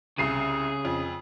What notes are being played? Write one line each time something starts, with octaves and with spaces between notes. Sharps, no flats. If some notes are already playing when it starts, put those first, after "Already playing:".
C2 C#3 G#4 C7 D#7
F2